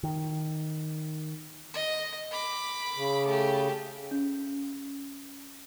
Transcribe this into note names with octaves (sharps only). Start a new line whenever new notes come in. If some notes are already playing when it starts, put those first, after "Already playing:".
D#3
D#5
B5 D6
C#3
A3 G4
C#4